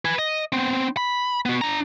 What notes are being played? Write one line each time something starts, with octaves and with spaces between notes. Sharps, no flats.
B4 G#5
D#5
B3 C4
B5
B3 F#4
D4 A#5